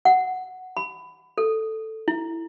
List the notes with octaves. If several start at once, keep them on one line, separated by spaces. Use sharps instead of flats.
F#5
B5
A4
E4